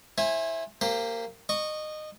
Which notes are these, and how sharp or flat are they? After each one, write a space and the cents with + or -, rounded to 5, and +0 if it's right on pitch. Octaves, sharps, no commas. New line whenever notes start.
E4 +0 C5 +35 G#5 -5
A#3 -20 G4 +10 C5 +0
D#5 -20 C#6 +0